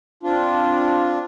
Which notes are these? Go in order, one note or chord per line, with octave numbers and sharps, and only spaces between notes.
C4 D4 F4